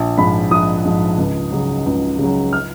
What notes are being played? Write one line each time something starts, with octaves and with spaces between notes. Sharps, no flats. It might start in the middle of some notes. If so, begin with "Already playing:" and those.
Already playing: A#1
G#2 F3 B5
A#1 D#6
G#2 F3
C#2
C#3 F#3
C#2
C#3
F#3
F6